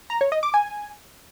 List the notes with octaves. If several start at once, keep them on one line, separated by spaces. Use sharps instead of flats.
A#5
C#5
D#5
D6
G#5